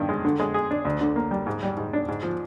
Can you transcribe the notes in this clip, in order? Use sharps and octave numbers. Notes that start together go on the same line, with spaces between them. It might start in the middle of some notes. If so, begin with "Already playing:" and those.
Already playing: G2 D#3
G#3
D3
G#3
G#4
D4
D2
D3
A#3
G3
G#2
G3
G#2
D4
G#2
F3